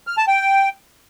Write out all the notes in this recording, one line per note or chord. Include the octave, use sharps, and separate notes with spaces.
F6
A5
G5